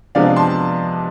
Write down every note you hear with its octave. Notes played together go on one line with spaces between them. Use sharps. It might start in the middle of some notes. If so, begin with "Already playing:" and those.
C3 F3 G#3 B3 D4 D5 F5
A5 C6